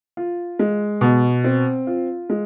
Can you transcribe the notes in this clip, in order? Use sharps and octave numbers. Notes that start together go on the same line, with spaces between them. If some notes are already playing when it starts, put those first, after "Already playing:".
F4
G#3
B2
C4
F4
G#3